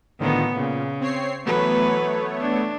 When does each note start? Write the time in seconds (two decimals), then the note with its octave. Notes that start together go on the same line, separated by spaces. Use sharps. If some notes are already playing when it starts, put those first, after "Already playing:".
0.20 A2 D3 D#3 F3 B3
0.56 A#2 C#3
1.01 C4 C#5 C7
1.46 E3 F#3 A3 B3 B4 C#5
2.40 D4